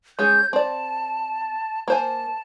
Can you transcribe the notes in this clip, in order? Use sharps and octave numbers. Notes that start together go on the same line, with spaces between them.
G#3 C#4 G#4 G6
C4 D5 A5
A#3 C5 G#5 A5